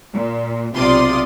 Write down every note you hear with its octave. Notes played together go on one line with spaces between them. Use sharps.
A#2
B1 C3 F4 D5 C6 D#6